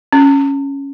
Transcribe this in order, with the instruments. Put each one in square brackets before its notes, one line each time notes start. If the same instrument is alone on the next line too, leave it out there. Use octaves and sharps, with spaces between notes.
[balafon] C#4